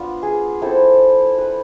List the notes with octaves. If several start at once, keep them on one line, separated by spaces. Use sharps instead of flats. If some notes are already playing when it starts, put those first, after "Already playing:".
Already playing: B3 D4 F4
G#4
A3 C4 E4 A4
B4